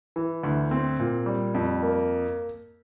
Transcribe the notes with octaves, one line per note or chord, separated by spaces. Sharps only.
E3
D2
C4
A#2
G3
F2
A#3